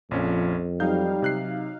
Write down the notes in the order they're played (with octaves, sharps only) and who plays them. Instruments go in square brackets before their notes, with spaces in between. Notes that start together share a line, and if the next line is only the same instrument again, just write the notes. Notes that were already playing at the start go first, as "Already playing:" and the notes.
[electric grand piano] A#1 C#4 [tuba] F2 [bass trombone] F3
[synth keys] F#3 D#4 F5 [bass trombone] G3 [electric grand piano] G6
[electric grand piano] C3 F#6 C7